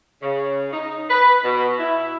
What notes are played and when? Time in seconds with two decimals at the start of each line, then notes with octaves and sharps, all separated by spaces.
0.22 C#3
0.72 D#4
1.10 B4
1.44 B2
1.79 E4